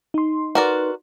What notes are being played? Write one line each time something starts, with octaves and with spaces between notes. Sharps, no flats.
D#4 C6
F#4 A#4 B4 D5